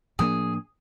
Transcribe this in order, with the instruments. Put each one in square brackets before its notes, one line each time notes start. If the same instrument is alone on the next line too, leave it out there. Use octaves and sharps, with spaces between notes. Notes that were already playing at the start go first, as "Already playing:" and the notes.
[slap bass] A2 F3 A#3 D4 [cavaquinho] G#4